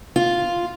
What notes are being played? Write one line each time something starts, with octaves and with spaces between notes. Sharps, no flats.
F4